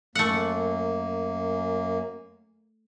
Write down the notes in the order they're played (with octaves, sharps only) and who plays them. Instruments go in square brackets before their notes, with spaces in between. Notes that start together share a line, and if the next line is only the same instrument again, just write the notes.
[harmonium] F#2 A#3 [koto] A3 F#5